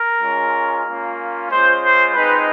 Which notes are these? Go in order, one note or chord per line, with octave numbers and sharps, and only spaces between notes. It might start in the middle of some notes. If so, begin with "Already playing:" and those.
Already playing: A#4
G#3 C#4 F4
A#3 C#4 F4
G#3 C#4 F4 C5
C5
G#3 C4 D#4 B4